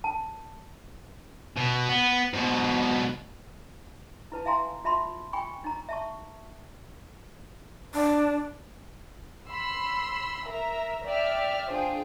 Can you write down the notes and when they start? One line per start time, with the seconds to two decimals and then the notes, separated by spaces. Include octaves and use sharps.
0.04 A5
1.57 B2
1.89 B3
2.33 G#2 B2
4.32 E4 B4 A5
4.45 E4 E5 F5 G#5 A#5 C6
4.84 F4 E5 A5 B5 C6
5.33 G5 G#5 B5 C#6
5.64 D#4 A#5
5.89 E5 A5 C#6
7.94 D4
9.49 B5 C6 E6
10.44 A#4 E5 A#5
11.06 D5 E5 G5 F6
11.69 D4 F4 G#4 C5 G5